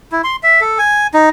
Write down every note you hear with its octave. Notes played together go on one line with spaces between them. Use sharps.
E4
C6
E5
A4
G#5
D#4